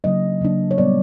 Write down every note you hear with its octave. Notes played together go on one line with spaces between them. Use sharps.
C#3 F#3 A#3 D4 D#5
C#3 F#3 A#3 D4
C#5
A#2 G3 B3 D5